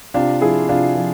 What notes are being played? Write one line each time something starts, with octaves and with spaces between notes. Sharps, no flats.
C3 D4 F4
F3 E4 G#4
C3 D4 F4
F3